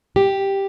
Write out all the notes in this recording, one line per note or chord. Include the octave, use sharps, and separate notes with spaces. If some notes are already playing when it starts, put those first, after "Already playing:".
G4